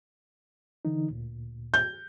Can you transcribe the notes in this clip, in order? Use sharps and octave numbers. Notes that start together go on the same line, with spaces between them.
D3 E3 D#4
D2 A#2
G6